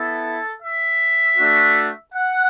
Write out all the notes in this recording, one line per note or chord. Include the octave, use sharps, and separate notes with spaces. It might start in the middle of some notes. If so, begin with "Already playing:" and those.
Already playing: B3 E4 A4
E5
A3 D4 F#4
F#5